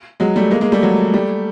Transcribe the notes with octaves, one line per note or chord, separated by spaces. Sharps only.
F#3 G#3
G3 A3
G#3 A#3
G#3 A#3
G3 A3
F#3 G#3
G3 A3